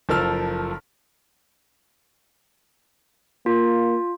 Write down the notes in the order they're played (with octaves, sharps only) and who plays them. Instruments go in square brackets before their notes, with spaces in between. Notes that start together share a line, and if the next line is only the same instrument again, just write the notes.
[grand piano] F#1 F3 A4 A#4 E6 F6
[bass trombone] A#3 [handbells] F4